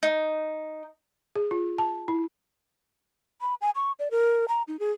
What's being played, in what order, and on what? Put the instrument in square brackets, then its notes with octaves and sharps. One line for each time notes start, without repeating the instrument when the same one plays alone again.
[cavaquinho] D#4
[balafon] G#4
F4
A5
E4
[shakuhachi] B5
G#5
C#6
D5
A#4
A#5
D#4
G#4